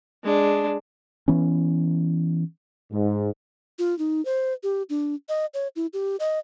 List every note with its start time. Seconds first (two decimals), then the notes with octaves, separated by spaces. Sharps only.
0.24 G#3 D4
1.28 E3 B3 C#4
2.91 G#2
3.79 F4
3.99 D#4
4.25 C5
4.63 G4
4.90 D4
5.29 D#5
5.54 C#5
5.76 E4
5.93 G4
6.20 D#5